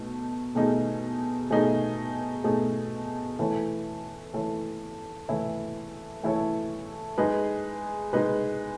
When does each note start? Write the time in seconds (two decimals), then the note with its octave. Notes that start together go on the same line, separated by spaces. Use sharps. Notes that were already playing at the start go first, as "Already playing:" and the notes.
Already playing: B2 A3 D#4
0.55 B2 A3 D#4 G#4
1.50 B2 A3 D#4 G#4
2.44 B2 A3 D#4 G#4
3.39 E3 A3 E4 A4 C#5
4.34 E3 A3 E4 A4 C#5
5.28 E3 A3 E4 A4 C#5
6.24 E3 A3 E4 A4 C#5
7.18 G#3 D#4 G#4 B4
8.13 G#3 D#4 G#4 B4